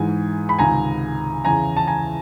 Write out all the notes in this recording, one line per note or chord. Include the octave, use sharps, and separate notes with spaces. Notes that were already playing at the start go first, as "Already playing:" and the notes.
Already playing: G#2 E3 G#5
B5
C#2 C3 D#3 G#5 A#5
E2 C#3 E3 G#5 A#5
A5
G#5 A#5